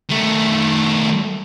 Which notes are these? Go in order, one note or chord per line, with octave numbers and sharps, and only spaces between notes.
D#3 A3